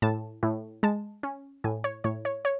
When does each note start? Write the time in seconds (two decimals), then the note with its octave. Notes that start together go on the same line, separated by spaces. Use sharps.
0.02 A2 A5
0.43 A2
0.83 G#3 A5
1.23 C#4
1.64 A2 G#5
1.84 C#5
2.04 A2 C#5
2.25 C#5
2.45 C#5